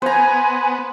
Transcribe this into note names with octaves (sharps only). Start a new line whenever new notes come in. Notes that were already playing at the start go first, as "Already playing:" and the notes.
B3 C5 G#5 A#5